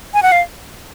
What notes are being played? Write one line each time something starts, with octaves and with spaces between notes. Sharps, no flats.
G#5
F#5
F5